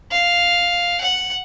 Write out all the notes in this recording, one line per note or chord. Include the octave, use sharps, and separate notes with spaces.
F5
F#5